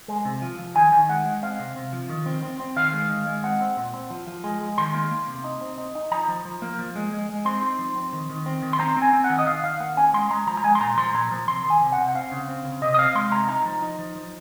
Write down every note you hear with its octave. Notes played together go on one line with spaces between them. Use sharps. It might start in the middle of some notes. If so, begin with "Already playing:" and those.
G#3
C3
F3
F3
D#3 G#5
D#3
G#3 F#5
G#3
C4 F5
C3
C3
F3
D#3
C4
C4
C4
D#3 F5
G#3
D#3
G#3
C4 F#5
C4
A#2
C4
F3
F3
G#3
G#3
D#3 C6
A#3
A#3
C3
D#4
C4
D#4
D#4
F3 A#5
F3
F3
A#3
F3
G#3
G#3
G#3
C4 C6
D#4
F3
C4
D#3
D#3
C4
D#3
C6
C4 A#5
C4
G#5
C4
F#5
D#3
D#5
D#3 F5
D#3 F5
A#3 F#5
C#4 G#5
G#3 C6
G#3 A#5
F3 A#5
A#5
G#3 G#5
C6
A#2 A#5
F3 C6
A#2 A#5
F3
C3 C6
D#3
G#5
C3
F#5
C3
F#5
C4 F5
C#3
C4
C#3
C3 D#5
D#5
C4 F5
G#3 C6
C3 A#5
D#4 A#5
F3
D#4
F3
F3